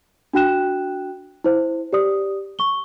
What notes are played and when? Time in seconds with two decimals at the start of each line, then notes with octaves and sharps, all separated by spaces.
0.33 D4 F#4 G5 F#6 E7
1.44 E4 C5
1.93 G4 D5 D#6
2.59 C#6 G7